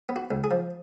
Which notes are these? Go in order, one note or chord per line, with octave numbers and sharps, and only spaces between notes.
B3
F#4
C#2
G#4
F3